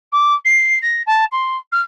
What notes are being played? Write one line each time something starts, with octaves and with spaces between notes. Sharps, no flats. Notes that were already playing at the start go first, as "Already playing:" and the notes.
D6
C7
A#6
A5
C6
F6